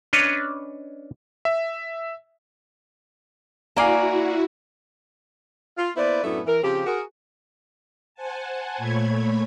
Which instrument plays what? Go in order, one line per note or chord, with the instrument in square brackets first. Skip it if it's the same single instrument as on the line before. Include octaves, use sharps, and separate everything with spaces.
[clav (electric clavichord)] C#4 D4 B4 C#5 D#5
[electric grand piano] E5
[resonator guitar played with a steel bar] A#3 D5 [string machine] E4 F#4 [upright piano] F5 G#5 A#5
[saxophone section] F4
A#3 B3 E4 B4 C5 D5
F#2 A2 A3 B3 D4 E4
E3 A#4
C#3 F3 C4 G4
F#4 G#4 A#4
[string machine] C5 F#5 G#5 A5
A#2 A3 C#5 B5 G#6